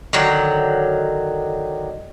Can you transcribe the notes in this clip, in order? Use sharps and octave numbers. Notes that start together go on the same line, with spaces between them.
D3 D#3 F#3